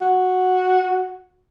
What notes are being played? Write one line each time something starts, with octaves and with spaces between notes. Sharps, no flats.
F#4